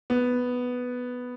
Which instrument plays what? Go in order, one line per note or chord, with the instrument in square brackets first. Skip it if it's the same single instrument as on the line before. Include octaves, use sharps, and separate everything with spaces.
[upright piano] B3